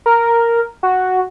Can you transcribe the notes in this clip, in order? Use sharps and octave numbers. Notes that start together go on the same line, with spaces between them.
A#4
F#4